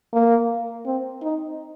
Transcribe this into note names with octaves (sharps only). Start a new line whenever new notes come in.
A#3
C4
D#4